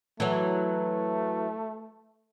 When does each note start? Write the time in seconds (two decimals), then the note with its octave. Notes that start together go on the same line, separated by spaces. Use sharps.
0.20 E3 F#3 A3